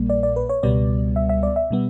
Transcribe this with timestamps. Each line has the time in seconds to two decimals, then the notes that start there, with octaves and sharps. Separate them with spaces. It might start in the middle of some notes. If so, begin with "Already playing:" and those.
Already playing: A#1 A#2 G3 A#3
0.09 D5
0.23 D5
0.36 B4
0.49 C#5
0.63 C#2 B2 G3 B3 D5
1.16 E5
1.29 E5
1.43 D5
1.56 E5
1.71 B2 G3 B3